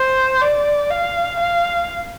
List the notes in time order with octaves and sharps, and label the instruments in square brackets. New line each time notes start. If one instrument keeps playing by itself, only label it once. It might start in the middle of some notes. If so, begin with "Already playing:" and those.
Already playing: [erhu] C5
D5
F5
F5